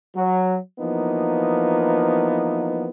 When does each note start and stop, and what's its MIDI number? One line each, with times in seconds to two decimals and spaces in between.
0.16 0.55 54
0.79 2.89 52
0.79 2.89 53
0.79 2.89 58
0.79 2.89 59
0.79 2.89 63